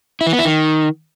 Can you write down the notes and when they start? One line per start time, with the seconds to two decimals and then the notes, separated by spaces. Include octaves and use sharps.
0.21 E4
0.27 E3
0.33 B3
0.39 E4
0.45 D#3